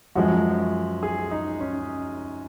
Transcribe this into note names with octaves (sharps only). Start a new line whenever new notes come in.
F#2 F3 G#3 F#4
G#4
D#4
C#4